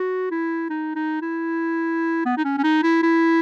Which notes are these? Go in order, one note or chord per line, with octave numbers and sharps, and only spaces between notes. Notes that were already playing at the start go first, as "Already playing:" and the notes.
Already playing: F#4
E4
D#4
D#4
E4
B3
D#4
C#4
C#4
D#4
E4
E4